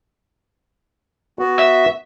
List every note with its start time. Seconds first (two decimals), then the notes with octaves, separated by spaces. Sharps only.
1.39 B3 F#4
1.59 E5